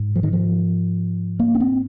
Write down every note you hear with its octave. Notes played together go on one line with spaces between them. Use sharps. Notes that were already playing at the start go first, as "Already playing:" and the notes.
Already playing: G#2
F3
D#3
F3
A#3
C#4
C4